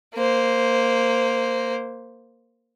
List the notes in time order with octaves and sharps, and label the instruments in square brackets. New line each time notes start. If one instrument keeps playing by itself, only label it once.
[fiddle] A#3 C5